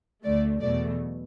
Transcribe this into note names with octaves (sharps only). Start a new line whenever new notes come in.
D2 D3 A3 D5
E2 B2 F#3 A3 D5